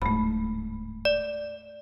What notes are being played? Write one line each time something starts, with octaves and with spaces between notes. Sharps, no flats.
D1 G#2 A3 B5
D5